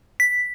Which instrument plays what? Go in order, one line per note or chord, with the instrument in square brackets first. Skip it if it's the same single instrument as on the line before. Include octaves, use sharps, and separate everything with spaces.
[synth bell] B6